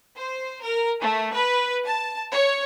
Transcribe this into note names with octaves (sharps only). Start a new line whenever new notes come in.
C5
A#4
A3
B4
A5
C#5